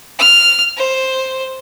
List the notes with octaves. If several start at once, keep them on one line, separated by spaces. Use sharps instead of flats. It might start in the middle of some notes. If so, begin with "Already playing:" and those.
F6
C5